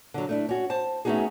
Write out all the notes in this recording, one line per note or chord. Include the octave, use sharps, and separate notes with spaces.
D3 F#3
A3 D4 E4
C#4 F#4
C5 A5
A3 B3 C#4 D#4 F#4 G#4